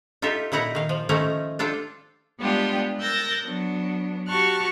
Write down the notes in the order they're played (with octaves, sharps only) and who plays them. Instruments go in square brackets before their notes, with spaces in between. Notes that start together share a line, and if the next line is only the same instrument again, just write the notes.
[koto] D#4 F4 G4 A4 E5
A#2 D#4 E4 F#5 A#5
D#3 F5
F3
D#3 F3 A3 C#4 D#4 A#5
D4 F4 A4 G5
[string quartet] G3 G#3 B3 D4 F4 G4
A#4 E6 F#6 G6 A6 A#6
F#3 B3 D4
F#4 G4 A5 C#6 F6 F#6